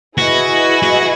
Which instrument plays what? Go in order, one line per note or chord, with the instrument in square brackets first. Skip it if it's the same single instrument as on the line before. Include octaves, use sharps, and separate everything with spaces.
[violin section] E4 G#4 B4 D#5 [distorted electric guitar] F#4
[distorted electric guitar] F#4